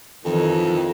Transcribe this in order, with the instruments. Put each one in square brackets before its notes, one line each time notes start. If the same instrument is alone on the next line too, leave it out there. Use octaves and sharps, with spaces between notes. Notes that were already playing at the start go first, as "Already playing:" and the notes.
[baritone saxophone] F2 [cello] D#3 E3